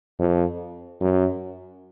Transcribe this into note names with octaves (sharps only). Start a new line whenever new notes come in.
F2
F#2